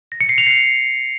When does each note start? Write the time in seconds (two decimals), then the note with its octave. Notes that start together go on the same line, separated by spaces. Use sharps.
0.12 A#6
0.21 C#7
0.29 C7
0.38 F7
0.47 C7